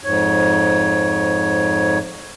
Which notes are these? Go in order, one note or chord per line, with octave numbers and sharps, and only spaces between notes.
F2 G#2 C#5